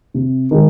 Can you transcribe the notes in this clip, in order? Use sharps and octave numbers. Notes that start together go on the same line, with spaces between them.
C3
D#3 G#3